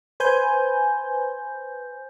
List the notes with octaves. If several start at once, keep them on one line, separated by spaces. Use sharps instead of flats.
B4 C5 G#5 G6